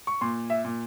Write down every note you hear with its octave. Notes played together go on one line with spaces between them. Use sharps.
C#6
A#2 C6
E5
A#2